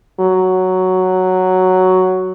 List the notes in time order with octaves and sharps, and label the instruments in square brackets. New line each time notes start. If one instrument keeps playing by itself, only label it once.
[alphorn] F#3